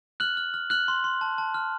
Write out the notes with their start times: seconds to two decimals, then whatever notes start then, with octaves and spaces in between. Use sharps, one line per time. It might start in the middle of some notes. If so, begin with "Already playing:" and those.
0.20 F6 F#6 F#7
0.37 F6
0.54 F6
0.70 F6 F#6 F#7
0.88 C6
1.04 C6
1.21 A5
1.38 A5
1.54 F6